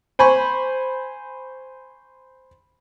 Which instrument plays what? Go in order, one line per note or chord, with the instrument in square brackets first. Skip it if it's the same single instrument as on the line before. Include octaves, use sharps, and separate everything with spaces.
[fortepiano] C5 G#5 B5 C#6